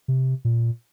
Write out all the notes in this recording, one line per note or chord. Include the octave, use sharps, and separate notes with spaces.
C3
A#2